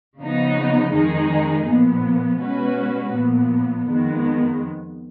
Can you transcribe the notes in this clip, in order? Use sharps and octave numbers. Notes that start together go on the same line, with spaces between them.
C#3 F3 B3 D#4
F2 D#3 G#3 D#4 G#4
A#2 F3 B3
B2 G#3 C#4 F#4 B4
A#2 F3 B3
F2 D#3 G#3 B3